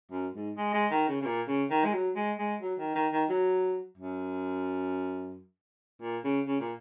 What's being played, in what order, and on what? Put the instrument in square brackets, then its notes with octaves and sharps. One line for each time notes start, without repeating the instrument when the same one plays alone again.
[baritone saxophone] F#2
G#2
G#3
G#3
D#3
C#3
C#3
A#2
C#3
D#3
G#3
F#3
G#3
G#3
F#3
D#3
D#3
D#3
F#3
F#2
A#2
C#3
C#3
A#2